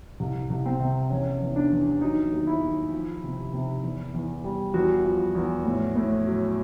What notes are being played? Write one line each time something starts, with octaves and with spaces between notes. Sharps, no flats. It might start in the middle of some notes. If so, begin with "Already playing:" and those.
C2
C2
C4
C3
E2 C#4
E2
D4
E2
F#3 D#4
D#2
E4
D#2
F3
C3
C3
E2
E2
G3
E2 F#4
F3
E2
A2
A2
F#3